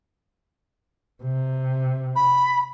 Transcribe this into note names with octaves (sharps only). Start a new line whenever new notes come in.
C3
B5